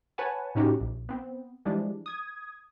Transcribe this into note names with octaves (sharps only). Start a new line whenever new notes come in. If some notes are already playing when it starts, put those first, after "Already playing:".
B4 C#5 F#5 G#5 A5
A2 C#3 C#4 D#4 F#4 G4
A#1
B3 C4
E3 F3 G3 G#3 D4
D#6 G#6